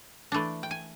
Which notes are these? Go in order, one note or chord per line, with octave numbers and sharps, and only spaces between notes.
E3 A3 D4
G5
G#5